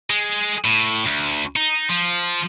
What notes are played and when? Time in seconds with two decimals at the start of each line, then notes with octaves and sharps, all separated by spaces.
0.10 G#3
0.65 A2
1.06 D2
1.56 D#4
1.89 F3